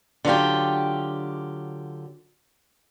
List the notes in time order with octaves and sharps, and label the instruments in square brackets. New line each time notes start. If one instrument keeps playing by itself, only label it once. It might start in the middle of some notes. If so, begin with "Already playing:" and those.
[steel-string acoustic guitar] D3 F#3 F4 G4